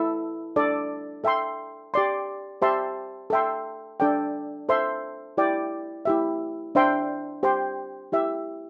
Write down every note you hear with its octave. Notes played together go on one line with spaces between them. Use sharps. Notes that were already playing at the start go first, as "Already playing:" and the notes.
Already playing: E4 A4 E5
D4 A4 D5
A4 E5 G5 C6
G4 D5 C6
G4 C5 E5 A5 C6
A4 E5 G5 C6
D4 A4 D5 G5
A4 C5 E5 C6
E4 G4 D5 G5
E4 G4 E5
D4 C5 E5 G5 C6
G4 C5 G5 C6
E4 G4 E5